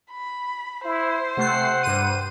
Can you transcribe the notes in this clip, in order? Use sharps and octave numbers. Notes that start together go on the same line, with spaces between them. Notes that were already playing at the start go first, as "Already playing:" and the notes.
B5
E4 C5
C3 A3 F#5 C7
G2 D#7